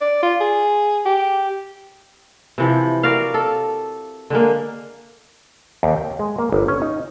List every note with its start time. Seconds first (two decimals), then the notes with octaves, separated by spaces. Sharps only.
0.01 D5
0.22 F4
0.40 G#4
1.06 G4
2.58 C3 E3 F3
3.03 F#4 A#4 D5 F5
3.34 A4
4.30 D3 G#3 A#3
5.83 D#2
5.96 G5
6.19 G#3
6.38 A#3
6.52 G1
6.68 C#4
6.82 D#4